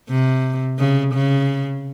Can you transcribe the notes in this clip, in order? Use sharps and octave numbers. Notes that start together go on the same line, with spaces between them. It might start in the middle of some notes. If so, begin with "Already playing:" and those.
C3
C#3
C#3